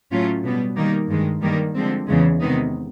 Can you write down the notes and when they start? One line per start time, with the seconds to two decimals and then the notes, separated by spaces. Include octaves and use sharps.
0.11 A2 F#3 A3 C#4 F4
0.44 B2 G3 B3
0.76 D#3 G3 A#3 D#4
1.09 G2 D#3 G#3
1.42 G2 D#3 G3 A#3
1.75 D3 F3 G#3 C4
2.08 E2 C#3 E3 G#3
2.40 C3 D#3 G#3 B3 D#4